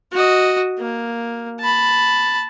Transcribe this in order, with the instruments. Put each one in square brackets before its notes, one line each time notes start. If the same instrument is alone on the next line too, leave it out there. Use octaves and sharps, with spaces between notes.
[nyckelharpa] F#4 D#5
A#3
A5 B5